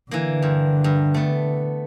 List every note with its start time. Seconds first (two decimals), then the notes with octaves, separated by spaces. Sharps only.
0.11 D3 E3 A#3
0.42 G2
0.84 G2
1.14 A3 B3